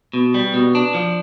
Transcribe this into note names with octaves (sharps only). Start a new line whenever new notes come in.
B2
G3
B2
D4
F3